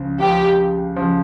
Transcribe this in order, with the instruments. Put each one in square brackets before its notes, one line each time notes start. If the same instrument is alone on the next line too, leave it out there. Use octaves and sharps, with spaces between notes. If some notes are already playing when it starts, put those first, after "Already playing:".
Already playing: [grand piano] C#2 C#3 F3
[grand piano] C#2 C#3 F3 [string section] G4
[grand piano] C#3 F3